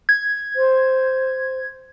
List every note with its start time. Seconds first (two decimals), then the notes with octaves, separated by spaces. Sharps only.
0.09 G#6
0.56 C5